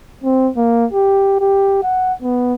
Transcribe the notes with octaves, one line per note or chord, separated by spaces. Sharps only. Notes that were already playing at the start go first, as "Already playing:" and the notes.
C4
A#3
G4
G4
F#5
B3